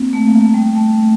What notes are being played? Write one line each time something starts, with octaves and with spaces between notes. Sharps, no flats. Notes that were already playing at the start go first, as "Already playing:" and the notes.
Already playing: A#3 C4
A3
A#3
A3
G3
A3